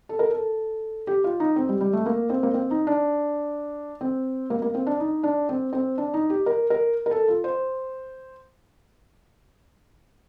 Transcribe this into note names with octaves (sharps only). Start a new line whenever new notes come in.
A4
A#4
A4
G4
F4
D#4
C4
G3
G3
A3
A#3
C4
A#3
C4
D#4
D4
C4
A#3
A#3
C4
D4
D#4
D4
C4
C4
D4
D#4
G4
A#4
A#4
A#4
A4
F4
C5